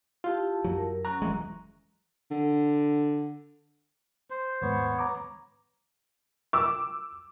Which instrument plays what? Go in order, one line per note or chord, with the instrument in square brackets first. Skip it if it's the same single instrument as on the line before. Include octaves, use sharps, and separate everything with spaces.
[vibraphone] E4 G4 A5 [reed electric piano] F4
[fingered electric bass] F#2 F#3
[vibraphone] A#4
[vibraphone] F#3 C#4 C#6 [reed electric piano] A#5 F#6
[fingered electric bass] D#1 E3 G#3
[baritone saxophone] D3
[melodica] C5
[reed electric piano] D#2 G#2 [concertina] B3 C#5
[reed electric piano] A#5 D6
[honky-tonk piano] D6 E6